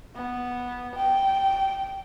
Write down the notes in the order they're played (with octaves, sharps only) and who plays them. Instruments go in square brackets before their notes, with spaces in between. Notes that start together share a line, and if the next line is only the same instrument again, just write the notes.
[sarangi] B3
G5